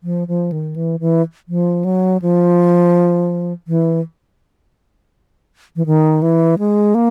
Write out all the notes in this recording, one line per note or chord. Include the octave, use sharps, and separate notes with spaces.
F3
F3
D#3
E3
E3
F3
F#3
F3
E3
E3
D#3
E3
G#3
A#3